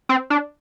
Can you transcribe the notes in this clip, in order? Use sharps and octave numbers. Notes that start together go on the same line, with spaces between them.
C4
D4